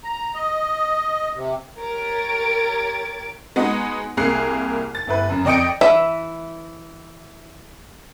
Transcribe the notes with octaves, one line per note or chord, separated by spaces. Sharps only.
A#5
D#5
C3
G4 A#4 C#5 A6 D7
G#3 B3 D#4 F#4
C2 A#3 G#4 F#6 C7
A6
G1 E4 B4
F#2
F2 D5 D#5 G5 C#7 D7
E3 E5